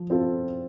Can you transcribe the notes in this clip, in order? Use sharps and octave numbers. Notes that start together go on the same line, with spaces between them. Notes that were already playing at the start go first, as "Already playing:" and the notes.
Already playing: F3
C4 F4 A4